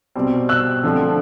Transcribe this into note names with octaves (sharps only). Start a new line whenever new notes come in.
B2 G3 C4
E6 F#6
D3 F3 A3 C4